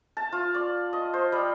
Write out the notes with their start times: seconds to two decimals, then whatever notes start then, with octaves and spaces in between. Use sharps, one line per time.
0.17 A5
0.33 F4
0.54 D5
0.93 D#5
1.14 C5
1.32 G3